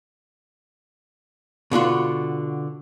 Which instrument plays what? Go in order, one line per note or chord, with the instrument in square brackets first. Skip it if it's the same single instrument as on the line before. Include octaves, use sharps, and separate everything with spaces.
[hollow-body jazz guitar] B2 D3 F4 F#4